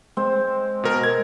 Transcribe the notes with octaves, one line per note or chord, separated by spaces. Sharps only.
G#3 C4
B2 A#4
G#6